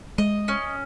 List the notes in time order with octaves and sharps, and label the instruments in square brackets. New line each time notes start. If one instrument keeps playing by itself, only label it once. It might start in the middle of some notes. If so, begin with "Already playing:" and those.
[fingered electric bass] G#3 [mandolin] D#5
[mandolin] C#4